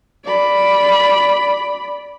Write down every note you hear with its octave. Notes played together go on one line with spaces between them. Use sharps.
D5 B5